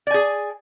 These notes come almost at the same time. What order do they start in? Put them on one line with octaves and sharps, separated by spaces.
D5 G#5 G#4